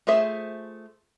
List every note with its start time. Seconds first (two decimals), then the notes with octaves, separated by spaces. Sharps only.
0.07 A3 F4 G#4 C5 E5